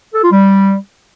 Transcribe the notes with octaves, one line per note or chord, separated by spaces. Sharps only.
A4
F4
G3